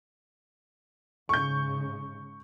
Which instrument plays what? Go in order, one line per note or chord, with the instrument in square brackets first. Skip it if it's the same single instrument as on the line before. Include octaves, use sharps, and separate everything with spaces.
[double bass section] G#2 C#3 [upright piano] C#6 G6